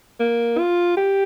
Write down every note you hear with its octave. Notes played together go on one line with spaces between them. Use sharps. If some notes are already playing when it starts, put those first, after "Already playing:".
A#3
F4
G4